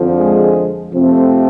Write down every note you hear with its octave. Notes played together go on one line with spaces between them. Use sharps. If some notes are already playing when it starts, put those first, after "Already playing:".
Already playing: F2 D3 F3
G#3 G#4
F2 C3 F3 A3 C4